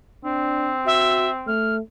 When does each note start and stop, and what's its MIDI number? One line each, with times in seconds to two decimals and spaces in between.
0.25 1.51 60
0.25 0.75 62
0.86 1.28 66
0.86 1.31 76
1.47 1.80 57
1.47 1.75 89